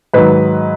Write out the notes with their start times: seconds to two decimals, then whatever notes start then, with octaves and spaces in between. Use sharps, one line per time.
0.14 G#2 D#3 F#3 B4